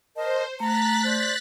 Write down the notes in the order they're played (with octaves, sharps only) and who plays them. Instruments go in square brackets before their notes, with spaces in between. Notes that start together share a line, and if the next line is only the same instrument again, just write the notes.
[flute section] A#4 D#5 A5 [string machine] C5
[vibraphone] A3 [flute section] A#5 [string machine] F#6 A6 B6
[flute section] C5 D5